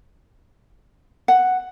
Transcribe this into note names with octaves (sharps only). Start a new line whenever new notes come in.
F#5